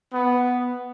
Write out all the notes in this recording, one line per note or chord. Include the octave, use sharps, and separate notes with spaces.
B3